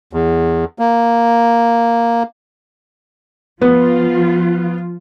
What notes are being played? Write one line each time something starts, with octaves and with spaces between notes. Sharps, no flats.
E2
A#3
F3 B3 F4